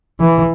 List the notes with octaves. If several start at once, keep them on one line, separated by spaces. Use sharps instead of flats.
E3